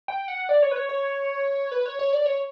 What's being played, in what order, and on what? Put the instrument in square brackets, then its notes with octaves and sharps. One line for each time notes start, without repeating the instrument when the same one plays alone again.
[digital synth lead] G5
F#5
D5
C#5
B4
C#5
C#5
B4
C#5
C#5
D5
C#5